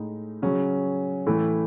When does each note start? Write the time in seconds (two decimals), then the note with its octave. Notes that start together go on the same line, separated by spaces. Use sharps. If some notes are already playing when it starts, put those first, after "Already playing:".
Already playing: A2 G#3 D#4
0.42 C#3 F#3 C#4
1.27 A2 E3 A3 E4